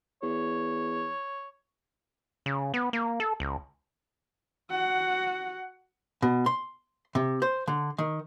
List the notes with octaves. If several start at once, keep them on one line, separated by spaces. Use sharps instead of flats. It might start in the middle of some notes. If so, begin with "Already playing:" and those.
E2 C#5
C#3
B3
A#3
A4
C#2
F#4 F#5
B2
C6
C3
C5
D3
D#3